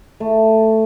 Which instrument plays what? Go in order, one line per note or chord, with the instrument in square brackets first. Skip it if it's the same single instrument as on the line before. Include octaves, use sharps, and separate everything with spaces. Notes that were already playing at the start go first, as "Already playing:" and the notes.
[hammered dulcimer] A3